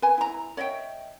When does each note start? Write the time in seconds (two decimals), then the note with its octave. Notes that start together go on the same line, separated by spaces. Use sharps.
0.02 B4 G#5
0.18 E4 A#5
0.57 C#5 D#5 E5 G5